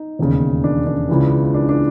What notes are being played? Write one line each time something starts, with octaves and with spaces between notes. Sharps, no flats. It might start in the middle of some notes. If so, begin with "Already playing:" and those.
Already playing: D#4
E1 D#2 C#3
D4
D4
C#2 C#3 E3
D4
D4